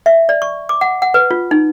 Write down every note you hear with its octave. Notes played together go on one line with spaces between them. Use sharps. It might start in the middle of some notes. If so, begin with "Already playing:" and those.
E5
D5
C#6
D6
F#5
F#5
B4
F4
D#4